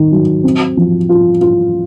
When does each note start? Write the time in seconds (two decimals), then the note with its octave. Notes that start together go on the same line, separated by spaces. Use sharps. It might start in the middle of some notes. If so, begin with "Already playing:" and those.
Already playing: D#3
0.12 F#3
0.44 C4
0.77 F3
1.09 F4
1.41 F4